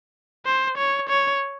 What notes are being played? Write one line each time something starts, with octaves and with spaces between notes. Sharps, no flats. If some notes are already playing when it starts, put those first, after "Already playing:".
C5
C#5
C#5